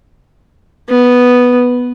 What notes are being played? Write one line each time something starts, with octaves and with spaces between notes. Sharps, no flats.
B3